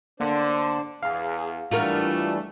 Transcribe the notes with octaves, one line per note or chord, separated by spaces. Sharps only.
D3 A#3 D4 C5 D5
E2 G#4 F5
C#2 E3 G3 A3 D4 F4 F#4 A#4